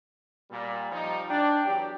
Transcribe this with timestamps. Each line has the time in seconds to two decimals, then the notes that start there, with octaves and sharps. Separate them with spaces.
0.50 A#2 G3
0.91 F3 G3 D#4
1.29 D4 G5
1.64 E2 F#3 G4